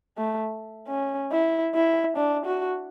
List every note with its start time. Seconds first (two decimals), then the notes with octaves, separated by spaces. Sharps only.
0.18 A3
0.88 C#4
1.32 E4
1.75 E4
2.17 D4
2.46 F#4